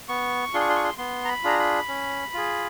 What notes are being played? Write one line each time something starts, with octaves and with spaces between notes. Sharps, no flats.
B3 C#6
D4 F4 G#4 C6
C#6
C6
C#6
C6
B3 C6
A#5
B5
D4 F4 G#4 A#5
B5
C#4
F4 G#4